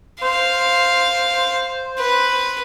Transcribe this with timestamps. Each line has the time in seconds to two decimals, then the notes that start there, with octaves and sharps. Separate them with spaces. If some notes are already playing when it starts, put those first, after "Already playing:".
0.22 C5 F5
1.99 B4